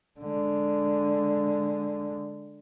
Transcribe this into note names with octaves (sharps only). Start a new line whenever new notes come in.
D3 G#3